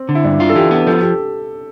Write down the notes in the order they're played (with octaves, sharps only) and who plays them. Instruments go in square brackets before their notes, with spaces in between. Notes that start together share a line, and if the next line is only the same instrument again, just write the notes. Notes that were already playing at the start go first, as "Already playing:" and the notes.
Already playing: [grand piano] C4
[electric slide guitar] D3
[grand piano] E4
[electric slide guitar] G2 [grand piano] D4
[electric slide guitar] F4
[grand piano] A4
[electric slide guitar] E3 [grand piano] G4
[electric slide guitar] B3
[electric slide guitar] F3 [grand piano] A4
[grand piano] G4